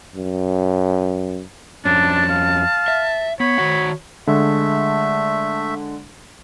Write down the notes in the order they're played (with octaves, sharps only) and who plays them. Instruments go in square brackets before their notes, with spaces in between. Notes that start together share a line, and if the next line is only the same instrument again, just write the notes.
[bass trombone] F#2
[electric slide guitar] F2 C#4 [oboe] D4 [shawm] A5
[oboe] F5
[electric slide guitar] E5
[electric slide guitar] B3 [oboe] C#5 [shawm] B5
[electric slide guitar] D#3 F#4 F#5
[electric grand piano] D3 G#3 [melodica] A3 E5